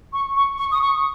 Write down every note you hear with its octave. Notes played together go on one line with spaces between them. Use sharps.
C#6
C#6
C#6
D#6
C#6